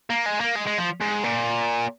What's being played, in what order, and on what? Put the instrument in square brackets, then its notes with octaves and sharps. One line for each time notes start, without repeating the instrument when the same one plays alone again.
[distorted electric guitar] A#3
G#3
A#3
G#3
G#3
F3
G#2
A#2